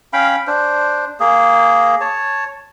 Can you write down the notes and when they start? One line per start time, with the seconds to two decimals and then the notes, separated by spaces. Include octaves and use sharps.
0.13 C#4 F5 G5 B5
0.47 D4 C5
1.20 A#3 G#4
2.01 C#5 A5